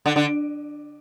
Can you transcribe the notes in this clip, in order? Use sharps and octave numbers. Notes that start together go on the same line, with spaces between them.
D3
D3